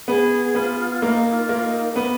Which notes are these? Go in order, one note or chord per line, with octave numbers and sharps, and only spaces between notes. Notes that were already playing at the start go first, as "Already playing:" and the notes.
B3 G#4
B3 F4
A#3 D#4
F4
A#3
D#4
B3 B4